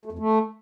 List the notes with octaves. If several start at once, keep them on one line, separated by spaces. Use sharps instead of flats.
A3
F2
A3